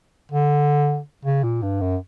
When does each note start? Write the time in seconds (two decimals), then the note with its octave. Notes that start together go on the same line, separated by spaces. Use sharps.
0.32 D3
1.25 C#3
1.43 A#2
1.63 G2
1.81 F#2